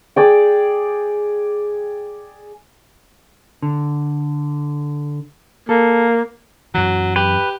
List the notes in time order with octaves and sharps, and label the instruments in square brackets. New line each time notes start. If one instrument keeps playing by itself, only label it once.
[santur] G#4 D5 G5
[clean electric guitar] D3
[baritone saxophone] A#3 [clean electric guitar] A4
[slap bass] F#2 E3 [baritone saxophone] F#3
[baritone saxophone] G4 [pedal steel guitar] B4